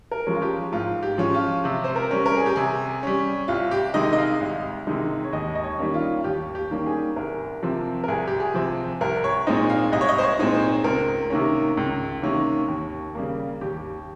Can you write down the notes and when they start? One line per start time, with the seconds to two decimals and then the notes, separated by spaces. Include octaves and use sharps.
0.11 A#4
0.26 F3 G#3 C#4
0.35 F4
0.42 G4
0.72 G#2 F4
1.03 G4
1.18 F3 G#3 C#4
1.34 F4
1.64 C3 G4
1.84 C5
1.96 A#4
2.11 G3 C#4
2.26 A#4
2.37 G#4
2.46 G4
2.56 C3 G#4
3.03 G3 C#4
3.48 C2 F4
3.71 G4
3.94 C3 D#3 G#3 D#4 D#5
4.13 D#5
4.18 F5
4.41 C2
4.87 C3 D#3 G#3 D#4
5.25 C#5
5.33 D#2 D#5
5.55 D#5
5.64 C#5
5.78 D#3 G3 A#3 C#4
5.94 F4
6.20 F4
6.24 D#2 G4
6.55 G4
6.71 D#3 G3 A#3 C#4
6.86 G#4
7.16 C2 A#4
7.63 C3 F3 C4
8.04 A#4
8.08 C2 G#4
8.27 G4
8.40 G#4
8.54 C3 F3 C4
9.01 C2 A#4
9.24 C#5
9.47 A#2 G#3 C4 D#4 D#5
9.70 F5
9.92 C2 D#5
10.01 C#5
10.09 D#5
10.19 C5
10.23 C#5
10.39 A#2 G#3 C4 D#4
10.55 C5
10.84 C#2 A#4
11.30 C3 D#3 A#3 C#4
11.77 C#2
12.22 C3 D#3 A#3 C#4
12.68 D#2
13.15 C#3 G3 A#3
13.61 D#2 G4